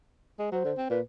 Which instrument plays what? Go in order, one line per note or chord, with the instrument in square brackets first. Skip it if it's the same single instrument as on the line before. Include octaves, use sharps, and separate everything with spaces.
[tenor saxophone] G#3
[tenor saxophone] F#3 [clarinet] C5
[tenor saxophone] D3
C4
[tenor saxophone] A#2 [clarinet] B4